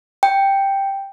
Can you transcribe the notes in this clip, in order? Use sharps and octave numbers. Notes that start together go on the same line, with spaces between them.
G5